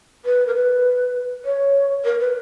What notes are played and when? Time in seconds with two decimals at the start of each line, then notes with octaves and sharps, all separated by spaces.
0.25 B4
0.47 A#4
0.55 B4
1.45 C#5
2.05 A#4
2.20 B4